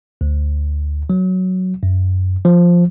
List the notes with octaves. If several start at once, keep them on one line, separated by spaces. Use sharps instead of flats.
D2
F#3
F#2
F3